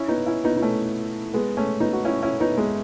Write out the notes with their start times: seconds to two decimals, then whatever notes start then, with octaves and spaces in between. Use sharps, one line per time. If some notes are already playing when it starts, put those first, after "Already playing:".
Already playing: C#4 E4
0.08 B3 D#4
0.26 C#4 E4
0.44 B3 D#4
0.57 D#4
0.62 A3 C#4
1.34 G#3 B3
1.57 A3 C#4
1.80 B3 D#4
1.93 F#4
2.05 C#4 E4
2.23 C#4 E4
2.40 B3 D#4
2.58 G#3 B3